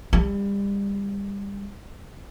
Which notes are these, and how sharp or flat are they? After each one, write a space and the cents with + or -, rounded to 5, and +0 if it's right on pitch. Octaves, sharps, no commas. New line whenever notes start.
G3 +30